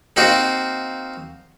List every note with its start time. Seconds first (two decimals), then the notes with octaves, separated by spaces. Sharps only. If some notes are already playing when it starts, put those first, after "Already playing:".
0.16 A#3 C4 D#4 F#4